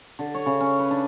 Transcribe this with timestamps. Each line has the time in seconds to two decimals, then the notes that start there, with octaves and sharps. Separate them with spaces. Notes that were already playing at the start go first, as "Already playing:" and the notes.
0.19 D3
0.34 C#5
0.46 C#3
0.60 C#4
0.79 B4
0.91 D4